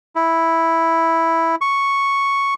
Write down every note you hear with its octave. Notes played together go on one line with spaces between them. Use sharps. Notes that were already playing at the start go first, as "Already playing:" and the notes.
E4
C#6